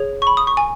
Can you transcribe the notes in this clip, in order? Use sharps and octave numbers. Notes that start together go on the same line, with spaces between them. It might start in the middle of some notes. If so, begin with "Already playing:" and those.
Already playing: G#4 C#5
C#6
B5
D#6
C#6
G#5